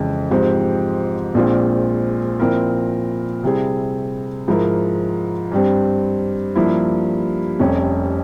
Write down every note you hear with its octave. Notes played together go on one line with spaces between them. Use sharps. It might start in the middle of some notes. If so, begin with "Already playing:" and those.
Already playing: F2 C#3 E3 G#3
G#2 F3 C4 G4 C5
A#1 A#2 G#3 C4 F4
A#2 F3 C4 E4 A#4
C3 G3 C4 E4 G#4
G#2 F3 G#3 E4 A#4
G2 G3 C4
G2 F3 A#3 E4
F1 F2 C3 G3 C#4